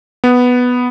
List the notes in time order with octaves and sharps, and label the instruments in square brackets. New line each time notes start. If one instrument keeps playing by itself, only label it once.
[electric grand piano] B3